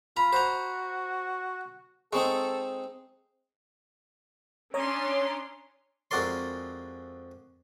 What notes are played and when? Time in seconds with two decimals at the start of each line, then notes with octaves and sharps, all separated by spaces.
0.17 F4 A#5 B5
0.33 F#4 C5 A#5
2.13 G#3 C4 D#4 A4 C#6
4.74 C#4 D4 C#5 A#5 C6 D#6
6.11 F2 G#3 F#4 A#4 D5 C6